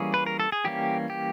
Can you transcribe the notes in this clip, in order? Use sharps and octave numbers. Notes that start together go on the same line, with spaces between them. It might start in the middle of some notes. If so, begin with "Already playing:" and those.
Already playing: E3 G3 A#3 C#4 G#4
B4
A#4
A4
G#4
E3 G3 A#3 C#4 G4
G4